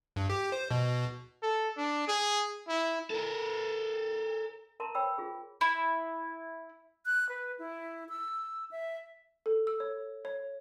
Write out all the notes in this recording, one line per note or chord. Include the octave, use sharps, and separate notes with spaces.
G2
G4
C5
B2
A4
D4
G#4
E4
A4 A#4
A#4 A5 A#5 C6
C5 C#5 G5 B5 E6
F4 G#4
E4
F#6
B4
E4
E6
E5
A4
E6
C#5
C#5